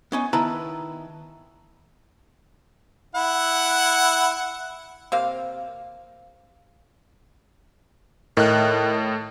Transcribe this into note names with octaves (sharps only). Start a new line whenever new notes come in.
B3 C#4 D#4
D#3 B3 E4 B4 A5 A#5
E4 F#5
C3 A#3 F5
A2 D#3 F#6